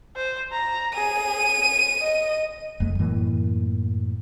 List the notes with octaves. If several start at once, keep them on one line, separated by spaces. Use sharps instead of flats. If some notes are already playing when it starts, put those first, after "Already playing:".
C5
A#5
G#4 D#7
D#5
F1 F2 G#3 A3
F#2 A2 E3 A#3